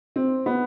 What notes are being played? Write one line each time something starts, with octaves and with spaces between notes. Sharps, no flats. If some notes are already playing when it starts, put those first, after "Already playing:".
C4
B3